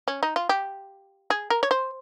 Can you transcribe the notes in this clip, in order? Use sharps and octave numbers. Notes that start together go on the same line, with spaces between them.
C#4
D#4
F4
G4
G#4
A#4
C#5
C5